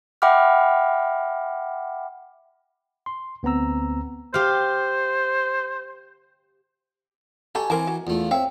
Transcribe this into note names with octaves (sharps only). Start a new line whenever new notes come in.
E5 F#5 G5 B5 D6 F6
C6
D2 B3 C4 A#5 E6
G4 C5 F5
F#3 G4 A4 D#5 G#5 A#5 C#6
E3 C4 A#4 A5 D6
F#4
E2 A3 F4
C4 C#5 E5 F5 G5